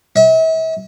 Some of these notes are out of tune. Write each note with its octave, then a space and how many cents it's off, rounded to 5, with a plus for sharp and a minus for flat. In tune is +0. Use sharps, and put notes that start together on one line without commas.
E5 -40